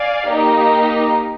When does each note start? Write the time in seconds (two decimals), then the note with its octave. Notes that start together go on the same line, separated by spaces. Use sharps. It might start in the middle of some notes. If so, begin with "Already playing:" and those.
Already playing: D5 F5 G#5
0.27 A#3 D#4 G4